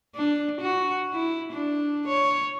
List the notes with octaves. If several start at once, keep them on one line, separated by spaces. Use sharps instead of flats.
D4
F#4
E4
D4
C#5